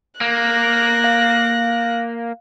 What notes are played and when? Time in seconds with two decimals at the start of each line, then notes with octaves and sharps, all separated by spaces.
0.21 A#3 F#6 A#6
1.04 F5